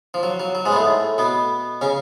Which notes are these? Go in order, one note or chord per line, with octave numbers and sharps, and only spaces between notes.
F3
F#3
F#3
F#3
G#2 G#3
B3
A2 A3
B2 B3
C#3 C#4